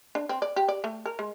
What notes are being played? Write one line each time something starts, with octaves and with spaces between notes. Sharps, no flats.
D4
C4
D5
G4
D5
A3
A#4
G#3